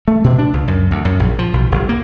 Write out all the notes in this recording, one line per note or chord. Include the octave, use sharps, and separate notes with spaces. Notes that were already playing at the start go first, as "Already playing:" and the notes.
A3
B2
D4
C#2
F#2
D2
F#2
A#1
F3
B1
G1
A#3